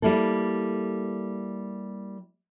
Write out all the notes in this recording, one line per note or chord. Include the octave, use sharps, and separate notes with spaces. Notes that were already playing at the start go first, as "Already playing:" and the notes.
G3 A#3 E4 A4